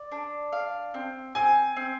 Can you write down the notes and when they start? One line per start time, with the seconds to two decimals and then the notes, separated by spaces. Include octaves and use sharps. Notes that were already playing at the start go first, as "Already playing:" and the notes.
Already playing: D5
0.12 D4
0.53 F5
0.94 C4
1.35 C4 G#5
1.76 C4